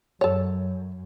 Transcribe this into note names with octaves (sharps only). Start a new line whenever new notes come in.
F#2 A4 C#5